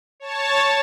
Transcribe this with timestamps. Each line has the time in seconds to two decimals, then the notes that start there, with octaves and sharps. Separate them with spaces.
0.20 C#5 A5